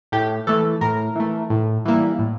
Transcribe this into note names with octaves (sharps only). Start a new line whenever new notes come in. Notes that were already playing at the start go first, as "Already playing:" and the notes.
A2 G4
E3 A3 A4
A2 A#4
E3 A3
A2
E3 G3 A#3 E4
A2